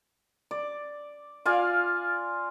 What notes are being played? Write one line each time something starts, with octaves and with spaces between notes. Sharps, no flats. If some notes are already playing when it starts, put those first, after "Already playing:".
D5
F4 D5 F5 G#5